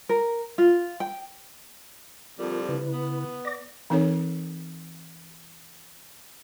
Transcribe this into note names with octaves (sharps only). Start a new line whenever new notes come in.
A#4
F4
G5
F2 D3 G3 F4 A#4
C#3 E4 B4
B3
D5 D6 A#6
E3 C4 D#4 A4 C#5